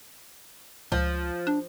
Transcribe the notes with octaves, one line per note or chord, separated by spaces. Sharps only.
C#2 F3
D4